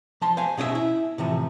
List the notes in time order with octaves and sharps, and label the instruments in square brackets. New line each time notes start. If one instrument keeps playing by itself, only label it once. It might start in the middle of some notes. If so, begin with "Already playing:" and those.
[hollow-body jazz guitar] F3 A5 C6
C5 F5 G#5
B2 C#4 D#4 E4 E5
E4
A2 C3 E3 F3